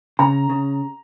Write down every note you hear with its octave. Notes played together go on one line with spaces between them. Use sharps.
C#3 A#5
C#3